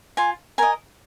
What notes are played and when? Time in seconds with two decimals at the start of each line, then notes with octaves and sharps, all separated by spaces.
0.17 F4 G#5
0.58 A#4 D#5 G#5